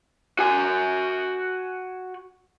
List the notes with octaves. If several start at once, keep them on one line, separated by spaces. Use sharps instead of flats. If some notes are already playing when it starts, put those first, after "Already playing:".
F#4 G#5